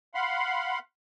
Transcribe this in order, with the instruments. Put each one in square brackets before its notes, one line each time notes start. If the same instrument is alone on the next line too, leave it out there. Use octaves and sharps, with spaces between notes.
[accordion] F5 F#5 B5 C6